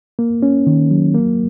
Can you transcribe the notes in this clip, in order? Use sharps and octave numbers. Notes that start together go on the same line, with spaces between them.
A#3
C#4
D#3
F#3
A#3